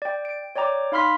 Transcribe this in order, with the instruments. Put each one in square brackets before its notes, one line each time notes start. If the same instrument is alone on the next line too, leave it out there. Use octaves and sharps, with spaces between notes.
[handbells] D5 G5
D7
C#5 D5 G5 A#5 D6
D#4 F5 B5 C6 F6 B6